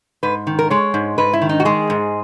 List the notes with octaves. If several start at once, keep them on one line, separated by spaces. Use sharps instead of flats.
G#2 B4
D#3
A#4
G#3 C#5
G#2
G#2 B4
E4
D#3
D#4
F#4
G#3 G#4
G#2